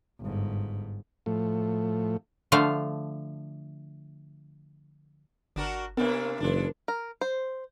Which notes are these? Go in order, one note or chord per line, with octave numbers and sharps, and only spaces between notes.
G1 G#2
A2 F3 A3
D3 F3 A3 F5
G1 D4 F#4 A#4
C3 A#3 B3 D4 A#4 B4
F#1 E3 D4
A#4
C5